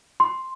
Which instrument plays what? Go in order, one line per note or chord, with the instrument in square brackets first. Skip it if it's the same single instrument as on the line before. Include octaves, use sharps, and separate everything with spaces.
[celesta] C6